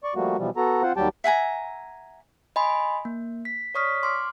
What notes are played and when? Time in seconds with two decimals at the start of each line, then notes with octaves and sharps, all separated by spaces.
0.04 D5 C#6
0.15 F3 G3 A3 A#3 F#4
0.38 B2 E3 F3 G3
0.57 B3 F#4 A4 A#5
0.83 C4 F4 C5 F#5
0.97 D#2 F#3 G3 G4 G5 A5
1.24 E5 F#5 G#5 A#5
2.56 D#5 G#5 B5 C6
3.05 A#3
3.45 B6
3.75 C#5 D5 C#6 D#6 F6 B6
4.03 C6 D6 F6